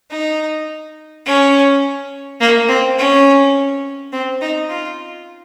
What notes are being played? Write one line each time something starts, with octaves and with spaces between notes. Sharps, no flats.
D#4
C#4
A#3
C4
C#4
C4
D#4
F4